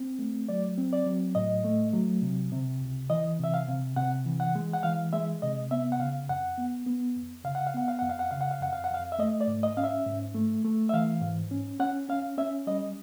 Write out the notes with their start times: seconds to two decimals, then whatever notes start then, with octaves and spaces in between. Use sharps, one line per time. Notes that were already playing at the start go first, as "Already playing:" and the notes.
Already playing: C4
0.19 A3
0.49 F#3 D5
0.78 C4
0.93 D5
1.06 F#3
1.35 A2 D#5
1.64 A3
1.93 F#3
2.22 C3
2.52 C3
2.81 C#2
3.10 E3 D#5
3.39 C3 E5
3.54 F5
3.68 C3
3.96 C3 F#5
4.25 E3
4.40 F#5
4.55 G#3
4.74 F#5
4.83 E3 F5
5.13 G#3 E5
5.42 C3 D#5
5.71 B3 E5
5.92 F#5
5.99 C#3 F5
6.29 F2 F#5
6.58 B3
6.86 B3
7.16 F2
7.44 C#3 F5
7.55 F#5
7.67 F5
7.74 B3 F#5
7.88 F5
7.99 F2 F#5
8.09 F5
8.19 F#5
8.31 C#3 F5
8.41 F#5
8.51 F5
8.60 F2 F#5
8.73 F5
8.84 F#5
8.90 F2 F5
9.12 E5
9.19 A3 D#5
9.41 D5
9.47 G#2
9.63 D#5
9.77 C#4 F5
9.84 E5
10.06 G#2
10.35 A3
10.65 A3
10.89 E5
10.93 E3 F5
11.22 G#2
11.51 C#4
11.80 C#4 F#5
12.09 C#4 F5
12.38 C#4 E5
12.67 G3 D#5